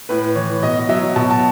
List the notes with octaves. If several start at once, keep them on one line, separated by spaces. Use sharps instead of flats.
A2 B4
E3 C#5
B2 D#5
D#5
F#3 E5
B2 A5
A5